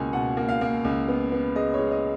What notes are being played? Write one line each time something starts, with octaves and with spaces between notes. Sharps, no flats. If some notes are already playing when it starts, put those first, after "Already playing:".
Already playing: C#2 B2 A#3 G#5
B2 F#5
A#3
F5
A#3
C#2
B3
B3
G#3 D#5
C#5
G#3
D#5